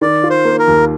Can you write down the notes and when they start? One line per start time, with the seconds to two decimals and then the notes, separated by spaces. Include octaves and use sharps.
0.01 D#3 D5
0.24 F4
0.30 C5
0.45 A#3
0.59 A#4
0.67 D#2